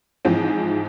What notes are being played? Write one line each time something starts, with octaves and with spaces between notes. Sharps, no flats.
G#2 E3 F3 C4